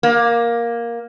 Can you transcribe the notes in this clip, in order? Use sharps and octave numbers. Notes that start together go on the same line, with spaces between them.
A#3